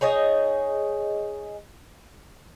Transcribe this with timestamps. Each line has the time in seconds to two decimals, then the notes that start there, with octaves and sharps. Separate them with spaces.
0.01 D#4 G#4 C#5 D#5